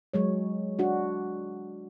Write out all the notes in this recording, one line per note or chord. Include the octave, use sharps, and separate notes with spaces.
F#3 G#3 C#5
D4 F#4